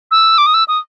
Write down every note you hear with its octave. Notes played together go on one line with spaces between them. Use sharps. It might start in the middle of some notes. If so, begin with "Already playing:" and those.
E6
D6
D#6
E6
D#6